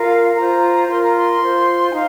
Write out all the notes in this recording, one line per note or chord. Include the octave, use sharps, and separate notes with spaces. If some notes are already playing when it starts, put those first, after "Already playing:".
Already playing: F4 A#4 F5
F4 C5 A#5
F4 A#4 C6
A#5
C6
F4 C5
G#5
D#4 F5